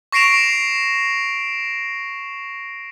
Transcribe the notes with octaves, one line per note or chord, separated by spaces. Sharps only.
C#6 A#6 C7 D7 E7 F7